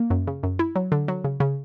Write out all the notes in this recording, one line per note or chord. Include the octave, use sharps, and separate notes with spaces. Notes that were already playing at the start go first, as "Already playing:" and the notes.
Already playing: A#3
F#2
C#3
F#2
E4
F#3
D3
F#3
C#3
C#3